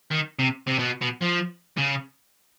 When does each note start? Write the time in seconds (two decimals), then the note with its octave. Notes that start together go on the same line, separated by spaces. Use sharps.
0.12 D#3
0.39 C3
0.67 C3
0.79 B2
1.02 B2
1.22 F3
1.78 C#3